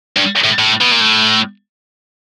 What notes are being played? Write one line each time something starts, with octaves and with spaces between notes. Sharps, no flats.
G2
A2
A2
B2
A#2
A2